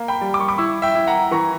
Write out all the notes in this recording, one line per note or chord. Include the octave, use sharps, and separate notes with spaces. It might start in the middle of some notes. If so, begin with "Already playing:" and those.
Already playing: A#3
G5 B5
G3
D6
C#6
B5 D6
E4 C#6 E6
E5 G5
E4
F#5 A#5
E3 A#5 C#6